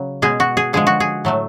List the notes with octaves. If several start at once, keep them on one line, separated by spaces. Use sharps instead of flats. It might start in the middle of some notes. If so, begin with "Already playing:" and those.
Already playing: C#3 F#3
B2 G#3 G#4
F#4
G#4
D3 F3 G#3 G#4
F#4
G#4
A2 F#3 A3